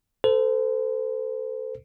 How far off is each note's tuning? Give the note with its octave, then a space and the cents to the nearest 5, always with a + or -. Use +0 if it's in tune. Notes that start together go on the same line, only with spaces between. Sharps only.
A4 +10 C5 -35